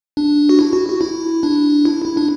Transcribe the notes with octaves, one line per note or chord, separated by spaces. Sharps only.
D4
F#4
E4
F#4
F#4
E4
D4
E4
E4
D4